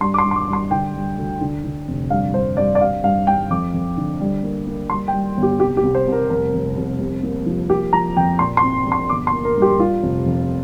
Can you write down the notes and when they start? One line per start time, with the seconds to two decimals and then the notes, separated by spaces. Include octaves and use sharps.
0.01 G2 C6
0.14 D6
0.18 C6
0.24 G2
0.31 C6
0.36 D6
0.48 G2
0.53 C6
0.71 D3 G5
0.94 G3
1.18 D2
1.41 D3
1.64 D3
1.87 F1
2.10 G2 F5
2.34 G2 C5
2.57 G2 D5
2.75 D5
2.80 G2 F5
3.04 G2 F5
3.27 G2 G5
3.50 F2 D6
3.74 F2
3.97 D3
4.20 G3
4.43 A#3
4.67 A#3
4.90 G3 C6
5.08 G5
5.13 G3
5.37 G1
5.43 G4
5.60 C2 G4
5.77 G4
5.83 C2
5.95 C5
6.07 C2
6.12 A#4
6.30 F1 A#4
6.53 F1
6.77 F1
7.00 C2
7.23 A#3
7.46 F3
7.69 A#3 G4
7.93 F3 A#5
8.17 F2 G5
8.39 A#2 C6
8.57 C6
8.63 C4
8.86 A#1
8.92 C6
9.10 G1 D6
9.27 C6
9.33 A#3
9.45 A#4
9.56 G2
9.62 G4
9.79 G3 F4
10.03 F1
10.26 F2